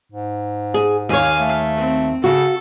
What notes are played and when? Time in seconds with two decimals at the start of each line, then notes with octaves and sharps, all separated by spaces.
0.12 G#2
0.74 G#4
1.09 D#2 C#5 F5 G#5
1.40 A3
1.77 C4
2.24 C#3 F#4 A4